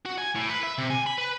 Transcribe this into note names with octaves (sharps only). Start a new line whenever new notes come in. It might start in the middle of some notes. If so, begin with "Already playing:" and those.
F#4
G#5
A2
B4
E5
C3
G#5
B5
B4